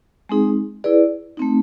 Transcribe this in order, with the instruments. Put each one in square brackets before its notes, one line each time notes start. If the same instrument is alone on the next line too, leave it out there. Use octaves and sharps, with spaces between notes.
[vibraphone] G#3 C4 D#4 G#4
E4 G#4 B4 D5
A3 C4 D#4